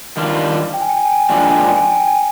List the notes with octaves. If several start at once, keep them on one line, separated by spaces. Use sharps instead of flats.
D#3 G3 D4 F4
G5
G#5
G5
G#5
G5
G#5
G5
A#2 F3 G#3 D4 G#5
G5
G#5
G5
G#5
G5
G#5
G5
G#5
G5
G#5
G5